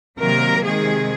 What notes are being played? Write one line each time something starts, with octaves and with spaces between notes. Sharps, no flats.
C3 D#3 F#3 A#3 A#4
C3 D#3 G#3 G#4